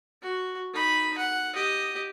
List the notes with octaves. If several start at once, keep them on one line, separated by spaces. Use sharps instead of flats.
F#4
D#4 B5
F#5
G4 D#5